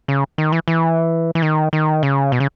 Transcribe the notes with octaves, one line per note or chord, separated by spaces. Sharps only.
C#3
D#3
E3
E3
E3
D#3
D#3
C#3
B2
C#3